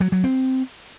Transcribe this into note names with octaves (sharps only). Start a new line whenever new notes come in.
F#3
F#3
C4